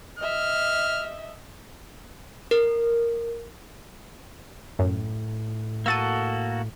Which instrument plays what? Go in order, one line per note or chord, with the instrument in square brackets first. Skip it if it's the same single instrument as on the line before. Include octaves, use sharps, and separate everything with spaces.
[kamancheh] D#5 E5 [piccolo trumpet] F6
[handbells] A#4
[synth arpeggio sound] F#2 [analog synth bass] A2
[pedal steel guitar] A#3 F#4 A4 [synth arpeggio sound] E6 A6 D#7